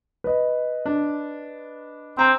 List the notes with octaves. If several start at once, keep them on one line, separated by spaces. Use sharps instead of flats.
B4 D#5
D4
C4 A#5